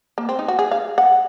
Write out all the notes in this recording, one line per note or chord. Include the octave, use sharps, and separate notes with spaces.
A#3
C4
D#4
F#4
G#4
F5
F#5